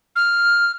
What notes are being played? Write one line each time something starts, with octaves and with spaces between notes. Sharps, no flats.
F6